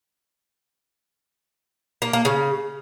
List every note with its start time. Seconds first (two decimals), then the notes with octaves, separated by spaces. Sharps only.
2.02 A#3
2.13 A#3
2.25 C#3